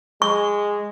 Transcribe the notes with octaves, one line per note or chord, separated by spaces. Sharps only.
G#3 C#6